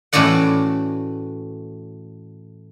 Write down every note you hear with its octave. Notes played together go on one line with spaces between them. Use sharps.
A2 E3 C#4 F#4 D5 F#5